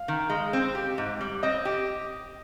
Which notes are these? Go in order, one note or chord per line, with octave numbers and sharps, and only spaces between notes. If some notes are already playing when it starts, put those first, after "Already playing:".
Already playing: F5
D#3
G#3
C4
G4
G#2
G3
C4 D#5
G4